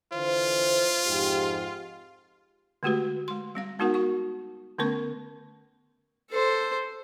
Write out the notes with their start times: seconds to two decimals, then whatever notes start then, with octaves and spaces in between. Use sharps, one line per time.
0.13 D3 E3 F4 C5
1.07 F2 G#2 G4
2.83 D3 G#3 A3 F#4 G4 B4
3.28 G#3 C6
3.55 G3 C4 F5
3.79 G#3 B3 D#4 F#4 A#4 F#5
3.94 F#4 C#6
4.78 D3 A3 B3 C#4 A#4 C#6
6.30 A4 C5